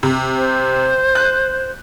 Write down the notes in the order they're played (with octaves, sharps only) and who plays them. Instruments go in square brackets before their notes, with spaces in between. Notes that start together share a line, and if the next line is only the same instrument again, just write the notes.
[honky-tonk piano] C3
[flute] C5
[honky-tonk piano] F#6